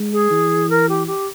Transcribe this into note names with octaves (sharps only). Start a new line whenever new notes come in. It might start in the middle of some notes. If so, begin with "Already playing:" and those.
Already playing: G#3
G#4
E3
A#4
G4
G4